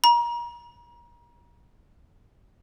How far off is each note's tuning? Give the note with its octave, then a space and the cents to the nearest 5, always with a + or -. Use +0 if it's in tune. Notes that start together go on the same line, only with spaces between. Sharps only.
A#5 +35